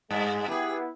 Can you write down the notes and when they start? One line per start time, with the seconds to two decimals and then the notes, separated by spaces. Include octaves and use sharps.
0.11 G2 G#3
0.48 B3 E4 G4 G#4